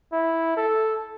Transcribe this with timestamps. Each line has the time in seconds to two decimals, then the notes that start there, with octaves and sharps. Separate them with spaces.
0.12 E4
0.56 A4